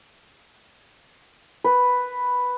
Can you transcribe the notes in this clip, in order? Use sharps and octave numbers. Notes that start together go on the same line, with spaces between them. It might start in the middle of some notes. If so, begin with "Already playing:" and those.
B4